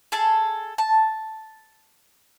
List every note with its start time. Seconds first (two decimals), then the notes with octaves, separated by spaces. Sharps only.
0.12 G#4 A4 A5
0.78 A5